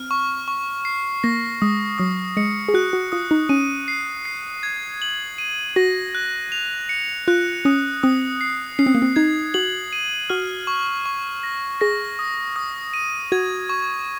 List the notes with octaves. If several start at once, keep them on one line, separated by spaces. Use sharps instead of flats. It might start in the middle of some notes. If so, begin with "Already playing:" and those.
Already playing: C4 F6
C#6
C#6
C7
A#3 A#6
G#3 D#6
F#3 D#6
G#3 C#7
G#4
F#4 F#6
F#4
F4 D#6
D#4
C#4 D#7
C7
C7
G#6
F#7
D#7
F#4 A#6
F#6
F7
C#7
F4 F#6
C#4 D#6
C4 D#6
C7
C#4 C7
C4
A#3
C4
D#4 G#6
F#4 F#7
D#7
F#4 F6
C#6
C#6
A#6
G#4 A#6
D#6
D#6
D#7
F#4 G#6
C#6